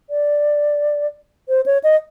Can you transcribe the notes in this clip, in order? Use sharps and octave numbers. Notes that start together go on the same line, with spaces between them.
D5
C5
C#5
D#5